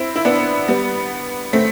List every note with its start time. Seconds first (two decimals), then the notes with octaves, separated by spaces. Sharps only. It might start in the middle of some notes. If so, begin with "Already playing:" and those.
Already playing: C4 E4
0.16 E4
0.25 B3 D4
0.68 G3 B3
1.53 A3 C4